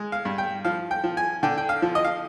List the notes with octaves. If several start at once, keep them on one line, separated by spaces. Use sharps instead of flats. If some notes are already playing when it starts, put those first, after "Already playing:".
Already playing: G#3
F5
G2
G5
F3 F5
G5
F3
G#5
D3 G5
G5
F5
F3
D#5
F5